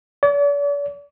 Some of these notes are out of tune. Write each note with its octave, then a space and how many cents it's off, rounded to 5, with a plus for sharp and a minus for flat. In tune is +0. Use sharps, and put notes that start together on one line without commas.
D5 -45